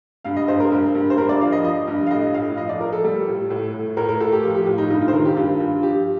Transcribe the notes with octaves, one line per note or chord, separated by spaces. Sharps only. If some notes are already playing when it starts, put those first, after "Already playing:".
G2 F5
D#5
G2 C5
A#4
G2
G2
C5
G2 A#4
D5
F3 F5
D#5
F3 D#5
G2
F5
A2 D#5
A2 F5
F3 D#5
D5
F3 A#4
A4
G3
A2
A2
A2
A2 A#4
A#4
A2 A4
G4
F3 F4
G4
A2 F4
D#4
G2 D#4
F4
C5
D#3 A#4
G4
G2 F4
G2 F4
F3 G4